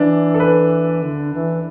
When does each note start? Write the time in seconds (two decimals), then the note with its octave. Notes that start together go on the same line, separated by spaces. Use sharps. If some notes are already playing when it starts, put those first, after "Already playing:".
Already playing: E3 D4
0.34 A4
0.40 B4
1.02 D3
1.34 E3